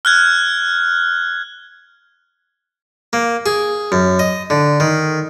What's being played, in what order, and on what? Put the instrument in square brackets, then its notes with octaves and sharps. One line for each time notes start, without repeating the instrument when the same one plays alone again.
[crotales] F6 F#6 G#6
[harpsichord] A#3
G#4
F#2
D#5
D3
D#3